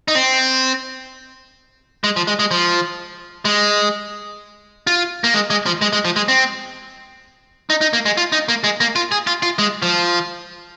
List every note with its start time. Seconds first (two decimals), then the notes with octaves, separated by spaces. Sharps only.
0.08 D#4
0.15 C4
2.04 G#3
2.16 F3
2.27 G#3
2.39 G#3
2.51 F3
3.45 G#3
4.87 F4
5.24 A#3
5.34 G#3
5.50 G#3
5.66 F3
5.82 G#3
5.93 G#3
6.05 F3
6.16 G#3
6.28 C4
7.70 D#4
7.81 D#4
7.93 A#3
8.06 G#3
8.17 F4
8.32 D#4
8.48 A#3
8.64 G#3
8.80 A#3
8.96 F4
9.12 G#4
9.27 F4
9.43 F4
9.59 G#3
9.82 F3